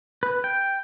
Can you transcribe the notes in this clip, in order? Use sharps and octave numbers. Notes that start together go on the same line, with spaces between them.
B4
G5